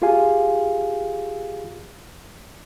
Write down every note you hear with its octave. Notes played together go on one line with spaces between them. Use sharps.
F4 G4 G#4 F5 G#5